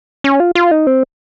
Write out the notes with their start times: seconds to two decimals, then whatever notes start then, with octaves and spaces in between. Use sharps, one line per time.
0.24 C#4
0.40 F4
0.55 F4
0.71 D#4
0.87 C4